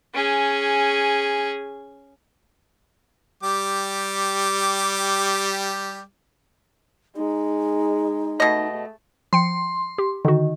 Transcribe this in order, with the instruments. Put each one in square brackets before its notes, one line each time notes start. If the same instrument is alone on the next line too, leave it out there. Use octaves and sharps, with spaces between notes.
[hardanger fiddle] C#4 G#4
[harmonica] G3 G4 D6
[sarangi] G#3 [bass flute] D#4
[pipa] B2 D#5 [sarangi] A3
[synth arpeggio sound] F3 G5 C#7 [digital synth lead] C6
[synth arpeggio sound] G4
[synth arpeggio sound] D3 F#4 [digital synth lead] D#3